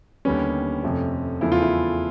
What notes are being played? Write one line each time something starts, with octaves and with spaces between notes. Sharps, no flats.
D#2 D3 G3 B3 C#4
F2 C3 F3 A3
E2 C#3 F3 A3 E4
F4
E4